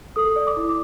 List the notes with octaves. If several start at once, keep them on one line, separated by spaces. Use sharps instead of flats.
A4 D#6
D5
D6
E4